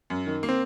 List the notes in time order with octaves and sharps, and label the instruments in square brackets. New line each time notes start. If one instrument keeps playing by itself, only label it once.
[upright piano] F#2
D#3
A#3
[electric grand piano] C4